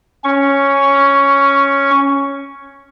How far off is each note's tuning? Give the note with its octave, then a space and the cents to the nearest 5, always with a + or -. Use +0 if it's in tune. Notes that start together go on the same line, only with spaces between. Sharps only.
C#4 +0 C#6 +10